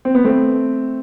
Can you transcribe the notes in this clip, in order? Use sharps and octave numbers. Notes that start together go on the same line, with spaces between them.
C4
B3
A3 C4